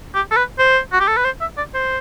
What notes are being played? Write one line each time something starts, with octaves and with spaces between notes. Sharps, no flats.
G4
A4
B4
C5
F#4
G4
A4
B4
C5
E5
D5
C5